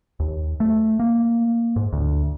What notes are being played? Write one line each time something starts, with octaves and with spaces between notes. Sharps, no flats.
D#2
A3
A#3
G#2
D2